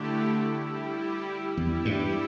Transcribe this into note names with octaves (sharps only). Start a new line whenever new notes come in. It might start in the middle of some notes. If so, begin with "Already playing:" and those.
Already playing: D3 A3 E4 G4
G3 E4 G4
E2 G3 E4 G4
G2